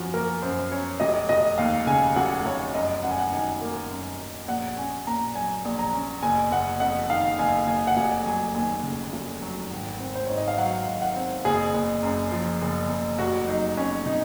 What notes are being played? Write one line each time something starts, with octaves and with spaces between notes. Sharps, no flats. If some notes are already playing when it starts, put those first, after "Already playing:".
Already playing: F#2 F3 C#4 F#4
A#3 A#4
F#2 C5
C#4 C#5
F1 D#5
F1 D#5
D#2 F5
C#3 G#5
F1 F#5
F1 C#5
F#2 D#5
F#2 F#5
G#5
F#5
D#3 G#5
A#3
F#2
F#2
A#1 F#5
C#4 G#5
A#2 A#5
F#3 G#5
A#1
A#5
C#4
F#1 G#5
F#1 F#5
F2 F#5
D#3 F5
F#1 G#5
F#1 G#5
F#5
F1 G#5
F#3 G#5
D#2 G#5
C#3
F1
F#3
G#1
C4
C5
G#2 C#5
D#5
F5
F#3 F#5
G#1
F#5
C4
F#1 G#4
F#1
F#2
F3
F#1
F#1
F1 F#4
F#3 D#4
F2 C#4
C3 D#4